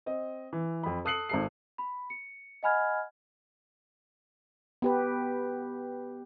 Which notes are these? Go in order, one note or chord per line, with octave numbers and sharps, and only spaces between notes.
C4 D#5
E3
F2 B5
A4 D#6 F#6 C7 C#7 F#7
G#1 A4 C7
B5
C#7
D#5 F#5 G#5 B5 F6 G#6
B3 G4 B4